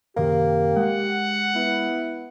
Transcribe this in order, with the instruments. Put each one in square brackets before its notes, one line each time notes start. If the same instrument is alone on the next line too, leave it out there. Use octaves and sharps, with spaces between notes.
[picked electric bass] F#2 C3 D#3 [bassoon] A#3 [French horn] G4
[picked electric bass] G#3 [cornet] F#5
[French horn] B3 [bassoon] E4